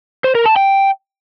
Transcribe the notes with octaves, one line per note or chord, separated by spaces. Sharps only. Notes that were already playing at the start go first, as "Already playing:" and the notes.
C5
A#4
A5
G5